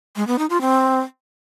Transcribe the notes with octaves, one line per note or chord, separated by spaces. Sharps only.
G#3
B3
D#4
F4
C4